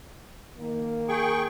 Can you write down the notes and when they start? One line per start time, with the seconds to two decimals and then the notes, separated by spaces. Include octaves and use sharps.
0.57 D#3 A#3
1.09 G#4 G5 C#6